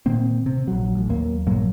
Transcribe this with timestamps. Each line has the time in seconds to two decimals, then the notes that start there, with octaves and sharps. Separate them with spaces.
0.06 A#2 D#3 A#3 C4
0.46 C3
0.68 A#1 F#3
0.95 A1
1.09 D#2 F#3 A#3
1.47 A#1 G2 F#3 A#3